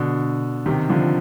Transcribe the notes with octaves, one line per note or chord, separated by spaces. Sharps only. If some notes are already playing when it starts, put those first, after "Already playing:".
Already playing: B2 D3
C3 D#3
D3 F3